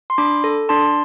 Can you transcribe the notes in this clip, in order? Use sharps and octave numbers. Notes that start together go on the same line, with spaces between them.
C6
D4 B5 D6
A4
D4 A5 C6